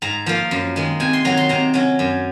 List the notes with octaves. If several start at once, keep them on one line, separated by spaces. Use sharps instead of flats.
G#2 A#5
F3 A#3
F#2
D#3 G#3
C3 G#5
C6
D#3 F#3 A#5
C6
C3 A#5
F#3 C#4
F#2